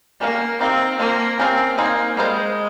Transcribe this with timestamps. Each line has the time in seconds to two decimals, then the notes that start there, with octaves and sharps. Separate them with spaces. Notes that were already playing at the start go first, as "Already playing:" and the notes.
0.21 A#3 C#4 G4 A#4 F5
0.60 A#3 C4 D#4 G4 A#4 F5
0.99 F3 A#3 C4 F4
1.39 C4 C#4 G4 A#4 F5
1.78 A#3 D#4 G#4 C5 F5
2.17 G3 G#3 A#3 F4 C5